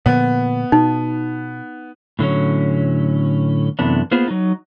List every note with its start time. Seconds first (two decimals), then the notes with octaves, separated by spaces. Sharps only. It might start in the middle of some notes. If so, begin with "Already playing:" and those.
0.06 A#2 D3 F3 B3
0.72 B2 D#4
2.19 A2 D3 F#3 C#4
3.79 F#2 C3 E3 A3 B3 D4
4.11 A#3 B3 F4 G#4 C5
4.28 F#3 D#4